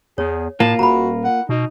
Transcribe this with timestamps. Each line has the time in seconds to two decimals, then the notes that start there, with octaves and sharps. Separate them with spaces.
0.18 E2 G#4 C#5
0.60 A2 A#3 F4 A5
0.79 D#1 F#4 A#5 B5
1.24 F#5
1.49 B2 D#4